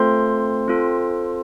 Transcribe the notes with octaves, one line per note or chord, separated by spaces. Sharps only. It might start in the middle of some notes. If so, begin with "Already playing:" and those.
Already playing: A3 C4 F4 A4 C5 C6
C4 F4 A4